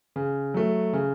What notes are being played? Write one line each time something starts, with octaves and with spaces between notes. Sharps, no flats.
C#3
F#3 A3
C#3